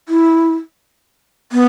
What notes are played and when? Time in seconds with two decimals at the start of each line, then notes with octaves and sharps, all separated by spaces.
0.09 E4
1.52 B3